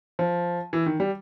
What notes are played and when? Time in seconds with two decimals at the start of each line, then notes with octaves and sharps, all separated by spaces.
0.19 F3
0.73 E3
0.86 D#3
1.00 G3